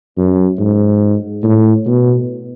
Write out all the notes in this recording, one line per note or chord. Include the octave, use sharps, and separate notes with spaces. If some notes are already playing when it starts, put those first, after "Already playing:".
F#2
G#2
A2
B2